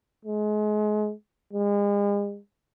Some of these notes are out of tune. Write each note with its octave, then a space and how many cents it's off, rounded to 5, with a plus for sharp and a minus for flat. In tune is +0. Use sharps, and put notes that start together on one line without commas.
G#3 +30
G#3 -40